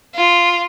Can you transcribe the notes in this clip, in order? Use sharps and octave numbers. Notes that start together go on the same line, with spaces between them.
F4